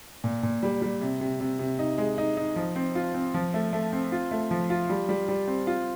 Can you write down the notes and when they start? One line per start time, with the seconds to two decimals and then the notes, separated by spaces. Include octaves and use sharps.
0.24 A#2
0.43 A#2
0.63 G3
0.82 G3
1.01 C3
1.21 C3
1.41 C3
1.59 C3
1.79 D#4
1.98 G#3
2.18 D#4
2.37 D#4
2.56 F3
2.76 C4
2.95 F4
3.14 C4
3.34 F3
3.54 A3
3.73 A3
3.92 C4
4.12 F4
4.31 A3
4.51 F3
4.70 F4
4.90 G3
5.09 G3
5.29 G3
5.48 C4
5.67 F4